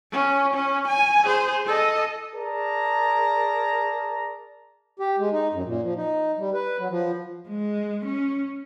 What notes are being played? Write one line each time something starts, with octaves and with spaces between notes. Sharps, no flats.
C#4
C#4
G#5
G#4 C5
A4 D#5
G#4 A#4 D5 A5 A#5
G4
G#3
D#4
F#2
A#2
F3
D#4
G3
B4
F#3
F3
G#3
C#4